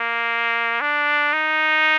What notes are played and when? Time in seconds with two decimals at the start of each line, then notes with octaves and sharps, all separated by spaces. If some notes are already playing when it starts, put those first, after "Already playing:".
Already playing: A#3
0.81 D4
1.33 D#4